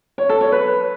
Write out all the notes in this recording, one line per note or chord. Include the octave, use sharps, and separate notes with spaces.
C#5
A4
C#5
B4